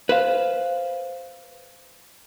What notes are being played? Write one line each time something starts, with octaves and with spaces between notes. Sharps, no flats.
B4 C5 F5